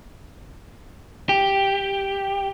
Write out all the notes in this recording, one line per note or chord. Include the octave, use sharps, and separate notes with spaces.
G4